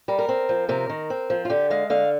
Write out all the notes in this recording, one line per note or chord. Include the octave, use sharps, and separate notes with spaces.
G3 A#4
A#4
C4
F3
C3 A#4
D#3
C4
F3
F4
D3 G4
G#3 F5
D3 F5